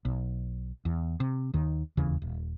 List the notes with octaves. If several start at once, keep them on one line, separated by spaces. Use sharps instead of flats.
B1
E2
C3
D#2 D#3
E1 D#2 C#3 E3
D#1